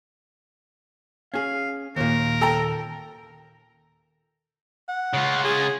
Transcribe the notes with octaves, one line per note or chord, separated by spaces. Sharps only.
C#4 G#4 F5
D#2 A#2 A#4
A4 G5 A#5
F#5
C#3 F4
G#4